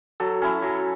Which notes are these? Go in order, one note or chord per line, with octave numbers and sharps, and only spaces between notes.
F#3 A4
C#4 E4
F#3